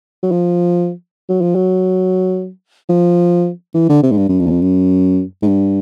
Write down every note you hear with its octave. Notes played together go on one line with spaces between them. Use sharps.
F#3
F3
F#3
F3
F#3
F3
E3
D3
C3
G#2
G2
F#2
F2
E2
F2
F#2
G#2
G2